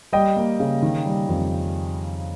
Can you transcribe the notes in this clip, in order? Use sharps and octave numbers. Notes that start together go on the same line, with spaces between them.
G3 D#5 G5
A#3
C#3
D#3
G3
F2